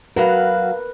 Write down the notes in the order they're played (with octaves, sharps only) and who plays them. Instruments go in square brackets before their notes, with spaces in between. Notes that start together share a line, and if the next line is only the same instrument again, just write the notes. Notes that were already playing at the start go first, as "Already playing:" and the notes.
[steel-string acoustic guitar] F#3 F#4 F5 [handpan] A#4 B4